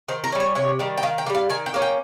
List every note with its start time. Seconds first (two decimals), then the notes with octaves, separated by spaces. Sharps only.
0.08 D#3 C5
0.24 A#4
0.32 G3 C#4
0.40 C#5
0.55 C3 C#5
0.79 D#3 G3
0.98 G5
1.03 D#3 F5
1.18 G5
1.26 A#3
1.30 G3
1.35 F5
1.49 D#3 G#5
1.66 G5
1.74 A#3 C#4
1.82 G5